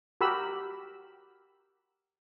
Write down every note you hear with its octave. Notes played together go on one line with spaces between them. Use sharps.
F#4 G4 A#4 B5 E6